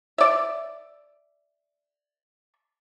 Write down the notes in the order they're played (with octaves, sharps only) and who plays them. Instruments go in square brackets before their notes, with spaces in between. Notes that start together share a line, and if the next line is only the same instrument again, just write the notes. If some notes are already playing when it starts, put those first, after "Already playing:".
[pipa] D5 E5